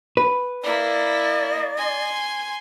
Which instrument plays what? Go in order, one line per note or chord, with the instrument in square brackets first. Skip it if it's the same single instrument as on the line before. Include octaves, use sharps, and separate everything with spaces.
[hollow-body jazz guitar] B4
[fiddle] A#3 E4 [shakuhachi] D5
[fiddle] G#5 C6